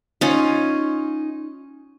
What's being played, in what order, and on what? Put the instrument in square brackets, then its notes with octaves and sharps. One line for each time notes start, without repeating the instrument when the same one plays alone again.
[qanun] C#4 F4 [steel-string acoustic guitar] D#4